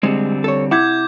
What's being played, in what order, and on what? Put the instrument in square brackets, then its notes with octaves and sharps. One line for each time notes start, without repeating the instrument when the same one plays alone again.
[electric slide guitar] D3 G3 C4 [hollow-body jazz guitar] G#3
[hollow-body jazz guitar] A4 C#5
[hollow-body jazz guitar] C3 E4 F#5 [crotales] D6 G6 G#6